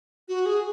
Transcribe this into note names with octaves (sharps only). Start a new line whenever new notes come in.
F#4
G#4